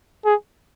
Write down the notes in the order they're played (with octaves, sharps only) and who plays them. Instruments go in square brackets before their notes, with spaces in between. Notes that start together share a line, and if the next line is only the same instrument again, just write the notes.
[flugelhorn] G#4